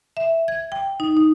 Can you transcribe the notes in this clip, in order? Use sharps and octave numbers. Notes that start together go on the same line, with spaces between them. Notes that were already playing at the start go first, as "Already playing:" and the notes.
E5
G#6
G5
D#4
D#4